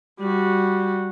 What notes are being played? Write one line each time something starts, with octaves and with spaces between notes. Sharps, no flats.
G3 F#4